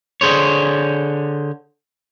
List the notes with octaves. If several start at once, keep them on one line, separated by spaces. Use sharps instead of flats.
D3 G#4 C5 C#5